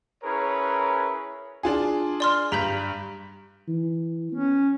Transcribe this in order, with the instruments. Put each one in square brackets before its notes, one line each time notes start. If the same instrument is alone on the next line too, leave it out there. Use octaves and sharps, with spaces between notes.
[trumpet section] C#4 E4 G#4 A#4 B4 C#5
[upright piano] D4 F4 G#4
[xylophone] D5 C6 F6
[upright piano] G2 B6 F#7 [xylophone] A#5 G6
[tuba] E3
[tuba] B3 [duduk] C#4